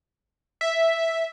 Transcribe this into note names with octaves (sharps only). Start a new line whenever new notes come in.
E5